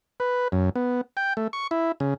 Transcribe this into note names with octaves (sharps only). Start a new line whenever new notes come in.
B4
F#2
B3
G5
A3
C#6
E4
C#3